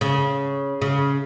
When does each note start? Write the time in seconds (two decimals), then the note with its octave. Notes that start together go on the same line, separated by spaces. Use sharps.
0.01 C#3
0.81 C#3